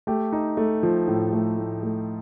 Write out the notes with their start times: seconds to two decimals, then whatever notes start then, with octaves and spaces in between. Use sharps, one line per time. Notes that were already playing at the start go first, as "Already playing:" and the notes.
0.07 A3 G4
0.33 D#4
0.57 A3
0.83 F3
1.08 A2
1.33 A3
1.58 A2
1.83 A3